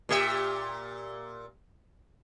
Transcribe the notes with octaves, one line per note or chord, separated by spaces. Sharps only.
A#2 G4 E5